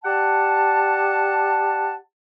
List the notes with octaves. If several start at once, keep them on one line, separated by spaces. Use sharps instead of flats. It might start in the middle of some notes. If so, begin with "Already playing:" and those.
G4 D5 F#5 A5